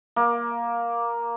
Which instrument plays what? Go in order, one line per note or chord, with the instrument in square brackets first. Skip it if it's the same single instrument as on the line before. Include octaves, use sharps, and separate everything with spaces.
[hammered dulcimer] A#3